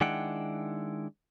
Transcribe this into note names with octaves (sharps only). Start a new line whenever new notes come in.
D#3 G#3 D4 E4 F#5 G5